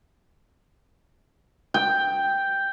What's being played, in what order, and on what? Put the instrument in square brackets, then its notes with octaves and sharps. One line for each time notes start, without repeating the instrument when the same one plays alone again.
[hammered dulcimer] G5